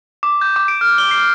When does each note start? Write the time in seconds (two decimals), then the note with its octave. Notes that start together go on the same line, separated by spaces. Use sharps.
0.23 D6
0.41 G6
0.56 D6
0.68 D7
0.81 F6
0.98 G7
1.11 C7